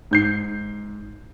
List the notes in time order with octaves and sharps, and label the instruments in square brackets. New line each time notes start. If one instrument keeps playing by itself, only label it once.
[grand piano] G#2 G6 C7